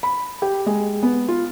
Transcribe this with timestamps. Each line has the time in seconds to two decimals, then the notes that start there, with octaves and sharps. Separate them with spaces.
0.03 B5
0.42 G4
0.66 G#3
1.03 B3
1.28 F4